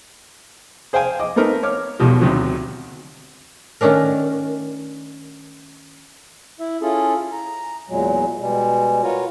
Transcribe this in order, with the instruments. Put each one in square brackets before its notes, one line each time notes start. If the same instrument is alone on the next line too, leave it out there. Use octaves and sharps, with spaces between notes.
[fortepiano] G#4 C5 F5 G5 G#5
D#5 D6
A3 C4 D#4 A#4 B4
C#5 D6 F6
B1 E2 B2 G3
D2 C3 D#3 F#3
[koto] D#3 A3 C#4 D4 A#4
[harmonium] E4 E5
C#4 E4 F4 G#4 A4
A#5
E2 A#2 F#3 G#3
B2 G3 G#3
F4 F#4 A#4 B4 C#5